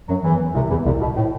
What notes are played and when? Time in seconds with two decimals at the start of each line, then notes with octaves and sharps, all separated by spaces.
0.08 F#2 F#3
0.23 E2 E3
0.54 C2 C3
0.70 E2 E3
0.86 C2 C3
1.01 B2
1.16 A2